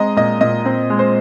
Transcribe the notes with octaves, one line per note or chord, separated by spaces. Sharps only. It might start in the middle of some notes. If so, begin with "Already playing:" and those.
Already playing: G#3 C4 D#5 A#5
A#2 D#5
A#2 D#5
C4
G#3
C5